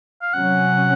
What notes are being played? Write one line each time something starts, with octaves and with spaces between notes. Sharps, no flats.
F5
C3 F#3 C#4 F#5